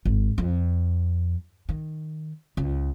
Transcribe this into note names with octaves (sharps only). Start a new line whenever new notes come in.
G#1
F2
D#3
C#2